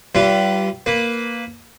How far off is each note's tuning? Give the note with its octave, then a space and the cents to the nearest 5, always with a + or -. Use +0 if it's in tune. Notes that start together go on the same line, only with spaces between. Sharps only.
G3 -25 F4 -45 B4 +5
A#3 +0 B4 +0